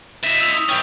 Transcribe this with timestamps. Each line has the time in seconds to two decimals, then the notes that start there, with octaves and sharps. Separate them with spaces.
0.24 D#4 E5 B6
0.41 E6 F7
0.53 D#6
0.69 E3 C#4 G5